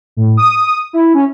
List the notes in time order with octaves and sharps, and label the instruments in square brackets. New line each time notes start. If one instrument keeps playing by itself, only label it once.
[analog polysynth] A2
D#6
E4
C#4